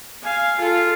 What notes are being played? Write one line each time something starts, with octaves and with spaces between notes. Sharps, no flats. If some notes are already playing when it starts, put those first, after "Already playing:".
F5 G#5
F4 A4